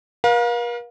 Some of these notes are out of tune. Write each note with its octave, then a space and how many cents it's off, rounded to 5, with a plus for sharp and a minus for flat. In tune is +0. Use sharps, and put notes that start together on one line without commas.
A#4 +45 F5 +25